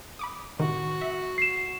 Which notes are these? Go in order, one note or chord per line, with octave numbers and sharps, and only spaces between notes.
B5 D6 D#6
A2 C3 D#3 F#4
E5
C7 E7